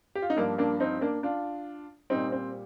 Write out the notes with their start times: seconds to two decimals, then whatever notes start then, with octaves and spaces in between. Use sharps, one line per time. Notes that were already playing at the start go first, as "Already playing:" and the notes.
0.15 G4
0.22 F4
0.30 D#4
0.36 G2 F3 A#3 D4
0.58 A#3 D4
0.80 C4 D#4
1.01 A#3 D4
1.23 D4 F4
2.10 A#2 G3 C4 D#4
2.32 C4